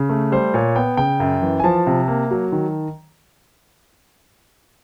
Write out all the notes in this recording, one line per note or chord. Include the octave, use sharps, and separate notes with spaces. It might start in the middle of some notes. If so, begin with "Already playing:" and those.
Already playing: C#3
A3
G3 C5
A#2 C#5
B3 G5
C#3 G5
F#2
E3
G#5
F3 A5
C3
A#3
F#3
D#3